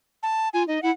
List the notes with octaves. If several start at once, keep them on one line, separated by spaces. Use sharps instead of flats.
A5
F4 G#5
D#4 D#5
E4 F#5